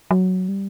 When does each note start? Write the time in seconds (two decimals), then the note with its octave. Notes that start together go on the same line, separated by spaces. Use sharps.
0.11 F#3
0.49 G3